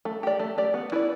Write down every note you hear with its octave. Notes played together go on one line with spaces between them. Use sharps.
A3
G4 D5
A3
G4 D5
B3
E4 B4 D5